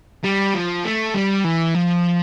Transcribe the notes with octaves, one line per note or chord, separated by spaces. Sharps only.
G3
F3
A3
G3
E3
F3